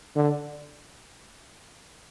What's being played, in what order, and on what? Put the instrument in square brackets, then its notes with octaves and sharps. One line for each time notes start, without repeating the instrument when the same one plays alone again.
[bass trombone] D3